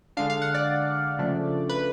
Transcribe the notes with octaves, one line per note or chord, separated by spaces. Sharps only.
D3 G#3 D4 F5
F5
F#5
D5
C#3 F3 A3 D4
B4